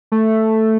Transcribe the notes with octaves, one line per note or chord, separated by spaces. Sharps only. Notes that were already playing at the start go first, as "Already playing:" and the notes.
A3